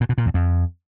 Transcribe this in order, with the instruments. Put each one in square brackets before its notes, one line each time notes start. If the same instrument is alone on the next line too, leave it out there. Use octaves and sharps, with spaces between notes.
[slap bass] A#2
B2
A#2
E2
F2